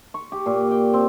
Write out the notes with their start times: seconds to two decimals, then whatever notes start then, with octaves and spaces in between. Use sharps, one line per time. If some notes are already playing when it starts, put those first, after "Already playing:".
0.14 C#6
0.32 G4
0.46 A#2
0.71 G5
0.93 C4